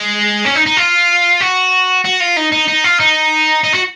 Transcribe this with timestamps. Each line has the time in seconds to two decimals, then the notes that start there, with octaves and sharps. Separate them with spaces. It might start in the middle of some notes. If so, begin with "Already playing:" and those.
Already playing: G#3
0.45 C#4
0.55 D#4
0.66 D#4
0.77 F4
1.41 F#4
2.04 F#4
2.20 F4
2.36 D#4
2.52 D#4
2.68 D#4
2.84 F4
3.00 D#4
3.63 D#4
3.74 F#4